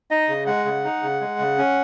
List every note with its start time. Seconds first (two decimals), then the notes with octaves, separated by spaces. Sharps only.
0.11 D#4 D#5
0.29 C#3
0.47 G#3 F#5
0.65 C#3
0.85 D#4
1.03 C#3
1.21 G#3
1.39 C#3
1.58 C#4